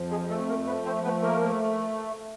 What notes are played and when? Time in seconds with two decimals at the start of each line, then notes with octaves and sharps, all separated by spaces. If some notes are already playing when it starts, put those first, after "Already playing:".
Already playing: F2 F3
0.11 G#3 G#4
0.29 A3 A4
0.48 A#3 A#4
0.67 F3 B3 B4
0.85 C4 C5
1.04 A3 B3 B4
1.22 A#3 A#4
1.42 A3